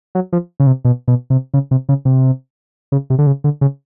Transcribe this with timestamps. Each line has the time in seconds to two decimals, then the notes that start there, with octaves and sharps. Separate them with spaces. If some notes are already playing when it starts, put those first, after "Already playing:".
0.15 F#3
0.33 F3
0.60 C#3
0.67 C3
0.85 B2
1.08 B2
1.30 C3
1.54 C#3
1.71 C3
1.89 C#3
2.05 C3
2.92 C#3
3.10 C3
3.19 D3
3.27 C#3
3.44 D3
3.61 C#3